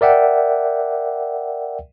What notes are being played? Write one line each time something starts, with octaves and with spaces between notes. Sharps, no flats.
A#4 D5 E5 F#5 G5